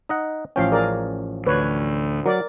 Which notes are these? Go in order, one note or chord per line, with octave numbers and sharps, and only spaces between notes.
D#4 D#5 F#5
A1 F3 C#4 F5 G5
G#4 A#4 D5
D2 B4 C#5
F#3 A#4 D5